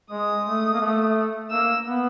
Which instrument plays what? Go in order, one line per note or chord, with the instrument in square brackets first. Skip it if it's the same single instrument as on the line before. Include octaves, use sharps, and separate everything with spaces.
[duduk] G#3 [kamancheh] D#6
[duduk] A3
A#3
A3
[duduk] A#3 [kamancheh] E6
[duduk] B3